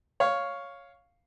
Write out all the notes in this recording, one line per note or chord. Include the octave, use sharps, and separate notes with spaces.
C#5 F5